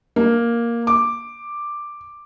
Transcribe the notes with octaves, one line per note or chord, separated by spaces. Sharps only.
A#3
D6